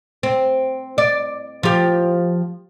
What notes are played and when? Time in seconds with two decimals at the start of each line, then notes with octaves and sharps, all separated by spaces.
0.23 C4
0.98 D5
1.63 F3 G4